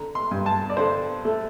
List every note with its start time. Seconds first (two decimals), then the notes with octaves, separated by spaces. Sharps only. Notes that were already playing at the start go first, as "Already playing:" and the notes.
Already playing: D3 A#5
0.15 C6
0.31 G2
0.46 A5
0.70 D5
0.77 D3 C5
1.25 A3